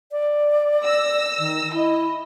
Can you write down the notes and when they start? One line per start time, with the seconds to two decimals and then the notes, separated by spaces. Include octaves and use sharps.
0.12 D5
0.82 E6 A#6
1.38 D#3
1.72 E4 D#5